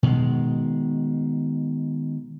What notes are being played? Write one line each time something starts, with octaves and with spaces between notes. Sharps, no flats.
B2 D#3 G#3